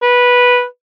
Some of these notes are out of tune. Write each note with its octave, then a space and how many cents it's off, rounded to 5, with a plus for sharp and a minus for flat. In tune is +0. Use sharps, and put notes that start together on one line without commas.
B4 -10